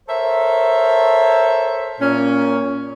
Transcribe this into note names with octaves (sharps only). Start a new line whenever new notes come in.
A4 A#4 C5 C#5 E5
A#2 C#4